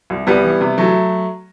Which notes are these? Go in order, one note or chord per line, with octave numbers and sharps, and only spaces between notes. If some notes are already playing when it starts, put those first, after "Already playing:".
C2
C2 G3 B3
E3
C3
E3 F#3 A3